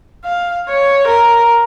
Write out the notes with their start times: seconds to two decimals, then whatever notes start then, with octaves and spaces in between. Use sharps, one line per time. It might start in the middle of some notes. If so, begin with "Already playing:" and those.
0.25 F5
0.69 C#5
1.08 A#4